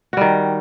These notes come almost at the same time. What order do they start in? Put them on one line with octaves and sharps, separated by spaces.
F#4 G3 D#3